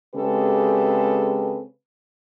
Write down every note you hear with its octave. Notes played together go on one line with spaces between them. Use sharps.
C#3 G#3 C4 G4 A4 B4